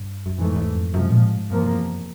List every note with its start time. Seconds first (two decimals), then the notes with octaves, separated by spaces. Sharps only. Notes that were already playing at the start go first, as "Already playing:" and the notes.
Already playing: G2
0.26 F#2
0.38 F2 G#2 E3 A3
0.56 E2
0.75 F2
0.94 F#2 C3 F3 G#3
1.11 A#2
1.23 A2
1.36 G#2
1.49 E2 G2 C3 F3 A#3
1.77 F#2